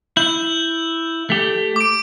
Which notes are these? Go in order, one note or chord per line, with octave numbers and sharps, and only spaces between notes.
E4 G6
A3 G4
D6 D7